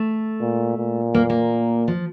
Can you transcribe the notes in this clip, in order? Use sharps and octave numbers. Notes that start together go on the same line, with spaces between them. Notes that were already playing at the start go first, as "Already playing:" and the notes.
Already playing: A3
A#2
A#2
A#3
A#3
F3